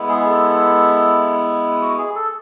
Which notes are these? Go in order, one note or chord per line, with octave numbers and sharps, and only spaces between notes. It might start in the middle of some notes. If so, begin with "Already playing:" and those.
Already playing: G#3 B3 E4
G#4
A4
F#4
G#4
A4